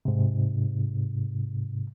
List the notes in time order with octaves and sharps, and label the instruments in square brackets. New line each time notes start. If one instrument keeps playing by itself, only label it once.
[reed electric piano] G#2 C3